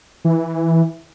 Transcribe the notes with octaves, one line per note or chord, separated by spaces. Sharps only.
E3